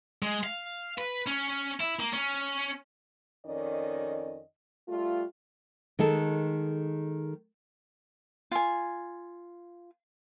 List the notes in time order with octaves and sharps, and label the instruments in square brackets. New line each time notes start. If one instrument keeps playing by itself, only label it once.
[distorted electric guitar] G#3
F5
B4
C#4
E4
A#3
C#4
[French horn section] F2 D#3 C#4 D5 D#5
G3 A3 F4
[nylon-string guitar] D#3 G#3 A4
[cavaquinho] F4 G#5